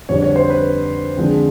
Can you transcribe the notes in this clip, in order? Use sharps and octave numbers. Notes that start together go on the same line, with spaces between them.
F2 D3 G3 C#5
C#5
C5
B4
D3 F3 G#3 C4